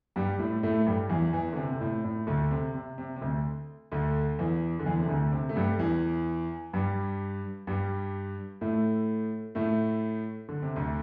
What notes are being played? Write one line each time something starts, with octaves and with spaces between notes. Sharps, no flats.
G2 G3
A2 A3
A2 A3
G2 G3
E2 E3
E2 E3
D3
C3
C3
A2
A2
D2 D3
C3
C3
C3
C3
D2 D3
D2 D3
E2 E3
D3
E2 E3
C3
D2 D3
C3
A3
G2 G3
E2 E3
G2 G3
G2 G3
A2 A3
A2 A3
D3
C3
D2 D3